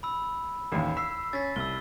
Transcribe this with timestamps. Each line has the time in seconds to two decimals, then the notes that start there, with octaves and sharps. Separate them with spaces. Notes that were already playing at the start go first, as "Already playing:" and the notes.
0.03 B5 E6
0.72 A1 D#2
0.97 E6 B6 C7
1.33 C#4 A6 B6
1.56 C2 E6 G7